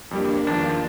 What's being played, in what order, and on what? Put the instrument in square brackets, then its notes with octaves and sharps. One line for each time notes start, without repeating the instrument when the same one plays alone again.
[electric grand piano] F2 G3 G4 [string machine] A#3 D4
[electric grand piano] E2 D#3 F3 [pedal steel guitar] D4 [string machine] F4